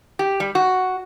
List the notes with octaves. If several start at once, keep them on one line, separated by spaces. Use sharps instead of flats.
G4
G3
F#4